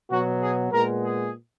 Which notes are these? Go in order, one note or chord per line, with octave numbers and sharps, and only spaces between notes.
B2 F#3 B3 F#4
G#4
A#2 G#3 B3 A#4
G#4